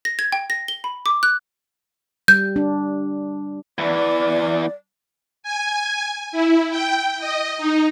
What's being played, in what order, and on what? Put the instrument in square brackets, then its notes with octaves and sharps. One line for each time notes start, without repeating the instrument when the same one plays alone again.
[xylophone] A#6
G#6
G5
A#6
G7
B5
D6
F#6
[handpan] G3 [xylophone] G6
[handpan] D4
[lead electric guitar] E2 E3 [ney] D5
[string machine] G#5
E4
G5
D#5
D#4